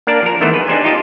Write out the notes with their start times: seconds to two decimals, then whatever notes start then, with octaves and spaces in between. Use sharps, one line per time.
0.07 A#3 D4 A#4 D5 A5
0.23 F3 A#4
0.41 D#3 E3 A3 B3 C5
0.53 G#4 B4
0.67 D4 D#4 G4 C5 D5 G#5
0.84 D#4 F4 G4 D#5 A5